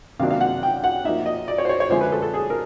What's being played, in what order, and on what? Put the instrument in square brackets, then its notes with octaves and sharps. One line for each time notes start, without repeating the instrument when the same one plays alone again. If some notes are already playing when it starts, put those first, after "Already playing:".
[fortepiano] C3 D#3 F#3 A#3 D4 F5
F5
F#5
G5
F#5
F3 A#3 D#4 E5
D#5
D5
C#5
C5
C#5
C#5
D3 F3 G#3 C#4 E4 C5
B4
A4
A4
G#4
A#4